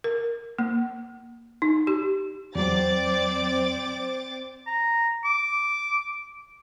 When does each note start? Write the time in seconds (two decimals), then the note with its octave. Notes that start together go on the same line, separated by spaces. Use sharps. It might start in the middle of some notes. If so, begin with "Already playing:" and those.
0.04 A#4
0.59 A#3
1.62 D#4
1.87 G4
2.55 E2 F#3 C4 D5 D6 A6
4.67 A#5
5.25 D6